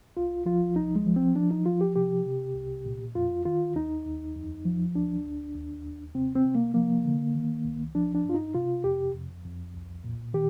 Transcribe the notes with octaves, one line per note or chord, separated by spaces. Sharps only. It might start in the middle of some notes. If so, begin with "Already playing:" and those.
C2 F4
F3 F4
C2 D#4
G#3
F3
C4
F3 D4
D#4
F3 F4
G4
C3 G4
C3
C2
A#2
F2 F4
D#3 F4
D#2 D#4
D#2
F2
F3
D2 D4
D2
D#2
D#2
C3 C4
C4
C3
A#3
F3 A#3
D3
D#3
C2
F3 D4
D4
G2 F4
D#4
C3 F4
F2 G4
F2
F2
C2
A#2
D#3 G4